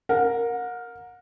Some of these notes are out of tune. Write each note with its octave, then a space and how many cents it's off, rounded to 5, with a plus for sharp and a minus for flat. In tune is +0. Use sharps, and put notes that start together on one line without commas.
A#4 +0 F#5 -35